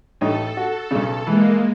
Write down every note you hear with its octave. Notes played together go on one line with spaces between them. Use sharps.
A1 D#4 A4 C#5
F#4
B1 C#3
E3 G#3 A#3